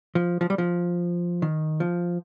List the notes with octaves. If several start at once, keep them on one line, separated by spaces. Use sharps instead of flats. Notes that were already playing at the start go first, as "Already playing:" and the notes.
F3
F3
G3
F3
D#3
F3